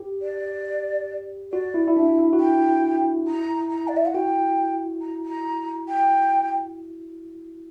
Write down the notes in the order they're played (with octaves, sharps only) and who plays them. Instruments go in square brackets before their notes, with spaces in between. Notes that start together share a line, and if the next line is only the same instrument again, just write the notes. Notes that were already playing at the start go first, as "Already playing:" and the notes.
Already playing: [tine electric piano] G4
[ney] D5
[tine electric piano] F#4 [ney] D5
[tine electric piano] E4
E4
[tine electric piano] D4 [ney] E5
[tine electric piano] E4
F#4
[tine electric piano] E4 [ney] G5
[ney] A#5
A#5
D5
E5
F#5
[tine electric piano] F#4 [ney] G5
[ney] A#5
A#5
G5